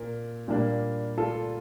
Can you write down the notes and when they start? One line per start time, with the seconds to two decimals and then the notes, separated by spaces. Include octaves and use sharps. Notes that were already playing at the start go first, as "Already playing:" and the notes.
Already playing: A#2 A#4
0.48 A#2 G3 A#3 D4
1.18 F4 A4